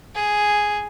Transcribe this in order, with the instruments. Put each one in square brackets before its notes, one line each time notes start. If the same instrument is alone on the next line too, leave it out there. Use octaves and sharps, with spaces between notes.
[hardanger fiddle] G#4